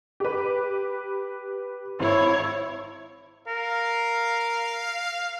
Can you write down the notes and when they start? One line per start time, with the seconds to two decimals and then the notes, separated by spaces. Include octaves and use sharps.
0.20 G4 B4
2.00 G#1 E4 C#5
3.47 A#4 F5